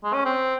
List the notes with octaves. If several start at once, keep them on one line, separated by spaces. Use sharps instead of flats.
G#3
C#4
C4